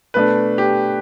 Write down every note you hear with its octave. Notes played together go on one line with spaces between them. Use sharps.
B2 A3 D4 B4
G4